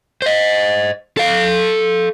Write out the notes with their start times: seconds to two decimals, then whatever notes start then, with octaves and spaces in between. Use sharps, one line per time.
0.22 C5 D#5
1.17 A4 F5